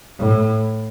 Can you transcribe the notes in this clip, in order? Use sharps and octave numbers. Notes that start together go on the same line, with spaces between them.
A2